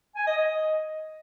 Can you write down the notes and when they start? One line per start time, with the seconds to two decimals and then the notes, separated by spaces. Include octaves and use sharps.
0.16 G#5
0.26 D#5
0.37 D#5